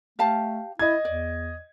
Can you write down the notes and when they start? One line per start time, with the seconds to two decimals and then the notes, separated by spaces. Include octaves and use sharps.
0.19 A3 G4 F5 A5
0.79 E4 D#5 G#6
1.05 E2 D5